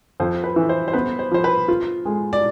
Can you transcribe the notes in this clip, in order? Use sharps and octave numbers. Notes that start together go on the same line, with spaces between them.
F2 C5
B4
E3
C5
C5
B3 B4
C5
F3 C5
B4
F4
G#3
D5